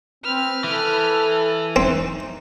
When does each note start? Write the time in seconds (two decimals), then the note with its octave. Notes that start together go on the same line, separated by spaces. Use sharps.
0.24 C4 B4 F6
0.64 E3 A4
1.76 C4 D#4